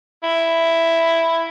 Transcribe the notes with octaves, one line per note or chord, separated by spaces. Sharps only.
E4